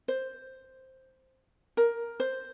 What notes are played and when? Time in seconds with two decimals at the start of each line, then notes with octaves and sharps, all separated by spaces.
0.08 C5
1.77 A#4
2.20 C5